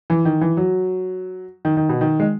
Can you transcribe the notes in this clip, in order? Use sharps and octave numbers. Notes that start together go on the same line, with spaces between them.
E3
D#3
E3
F#3
D#3
D#3
B2
D#3
G#3